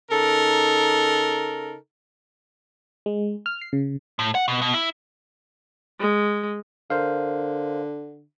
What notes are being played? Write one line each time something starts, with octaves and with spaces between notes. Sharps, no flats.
C#3 D#4 A4 A#4
G#3
F6
C7
C#3
A2
F#5
B2
B2
E4
G#3
D3 A#4 C5 F5